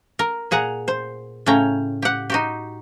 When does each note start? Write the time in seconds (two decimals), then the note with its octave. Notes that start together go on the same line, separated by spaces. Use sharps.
0.19 A#4
0.51 A#2 G#4 F#5 A#5
0.88 C5
1.46 A2 C#3 C#4 G5 A#5
2.02 G4 F#5
2.30 D#4 F#4 G4